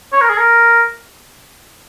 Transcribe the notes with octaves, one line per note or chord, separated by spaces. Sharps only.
C#5
A#4
G#4
A#4